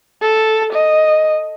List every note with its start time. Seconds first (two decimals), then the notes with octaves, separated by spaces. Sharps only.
0.22 A4
0.73 D#5